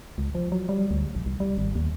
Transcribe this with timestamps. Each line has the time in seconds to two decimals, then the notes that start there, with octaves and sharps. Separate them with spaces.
0.18 C#2
0.35 F3
0.52 F#3
0.69 G3
0.91 D2
1.15 A#1
1.26 C2
1.40 G3
1.57 G#1
1.75 D#2